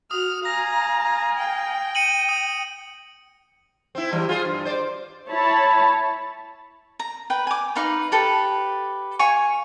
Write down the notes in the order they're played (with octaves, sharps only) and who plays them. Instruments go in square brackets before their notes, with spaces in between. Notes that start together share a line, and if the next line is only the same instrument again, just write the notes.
[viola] F#4 [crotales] D#6 [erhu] F6
[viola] F5 G#5 [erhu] A#5 [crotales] A#6
[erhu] G5
[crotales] C#7 D#7 F#7
D#6
[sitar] C4 E4
E3 G3 G#3
F4 G#4 C5
G2
C5 D5
[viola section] E4 C#5 A5 B5
[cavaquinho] A#5
B4 G5
G#5 D6
D#4 B4 F5 C#6
G4 A4 B4
C#5 F5 G#5 C#6